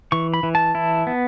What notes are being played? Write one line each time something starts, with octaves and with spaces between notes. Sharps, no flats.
E3 C#6
B5
E3
A5
E4
B3